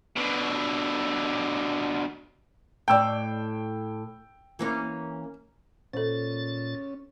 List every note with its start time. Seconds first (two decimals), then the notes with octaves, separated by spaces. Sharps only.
0.16 B2 D3
2.88 A2 D5 G5 E6
4.59 E3 A#3 C#4
5.93 A#2 C#4 A4 C5 A6